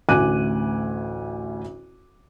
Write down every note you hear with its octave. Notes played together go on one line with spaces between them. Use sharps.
A1 D2 G#5 D6 F#6 D#7